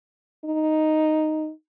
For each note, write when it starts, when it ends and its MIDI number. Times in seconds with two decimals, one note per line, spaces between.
0.45 1.50 63